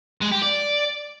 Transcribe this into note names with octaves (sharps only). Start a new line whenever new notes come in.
G#3
G4
D5